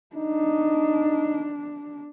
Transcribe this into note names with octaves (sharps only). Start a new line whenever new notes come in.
D4 D#4